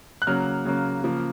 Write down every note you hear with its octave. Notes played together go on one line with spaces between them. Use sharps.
F#6
C#3 F#3 A#3 F6
C#3 F#3 A#3
C#3 F3 A#3